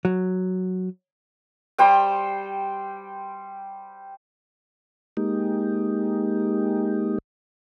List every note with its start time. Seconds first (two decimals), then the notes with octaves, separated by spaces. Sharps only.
0.05 F#3
1.78 G3 C5 G5
5.17 G#3 A#3 D#4 G4